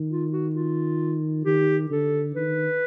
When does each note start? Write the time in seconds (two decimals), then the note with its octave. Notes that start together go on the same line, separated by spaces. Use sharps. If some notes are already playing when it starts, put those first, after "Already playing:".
Already playing: D#3
0.10 F4
0.32 F#4
0.55 F4
1.45 D#3 G4
1.90 D3 A4
2.36 D#3 B4